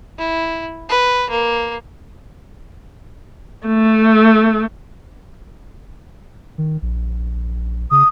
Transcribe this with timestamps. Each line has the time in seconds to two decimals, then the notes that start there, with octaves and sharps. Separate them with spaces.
0.18 E4
0.89 B4
1.30 A#3
3.67 A3
6.58 D#3
6.82 A#1
7.91 C#3 D#6